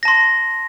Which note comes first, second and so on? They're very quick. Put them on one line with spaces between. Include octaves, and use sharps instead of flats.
A#6 A5 C6